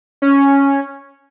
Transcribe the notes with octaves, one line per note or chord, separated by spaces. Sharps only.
C#4